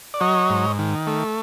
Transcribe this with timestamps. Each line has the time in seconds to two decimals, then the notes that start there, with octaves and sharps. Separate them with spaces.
0.14 D5
0.21 F#3 C#5 D#5
0.50 G#2
0.79 D#3
1.07 A3